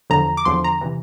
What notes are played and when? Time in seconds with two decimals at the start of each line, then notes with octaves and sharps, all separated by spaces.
0.10 E2 D3 F3 A#5
0.37 D6
0.45 E2 D3 F3 C6
0.64 A#5
0.81 C3 E3